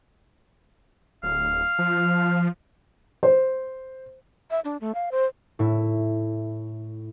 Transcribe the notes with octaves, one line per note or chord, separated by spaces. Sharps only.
D1 F5
F3
C5
E5
D4
A3
F5
C5
A2 E4